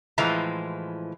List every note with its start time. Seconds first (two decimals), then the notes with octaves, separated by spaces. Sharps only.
0.18 A2 E3 F3 G#3 A#5